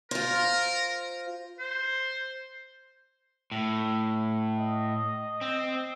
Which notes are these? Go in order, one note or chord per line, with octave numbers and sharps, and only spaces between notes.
F4 A#4 C5
C5
A2
D#5
C4